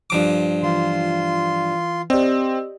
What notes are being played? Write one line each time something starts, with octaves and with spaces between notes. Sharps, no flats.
G2 F3 D6
E3 F4 C6
C4 G4 D5 D#5